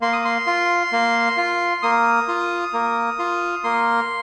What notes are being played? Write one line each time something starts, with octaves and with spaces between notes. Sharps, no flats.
A#3 C6
D#6
C6
F4
A#3
F4
A#3 D#6
F4
A#3
F4
A#3 C6